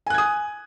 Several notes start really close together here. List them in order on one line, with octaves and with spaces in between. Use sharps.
G#5 F#6 G#6 D#6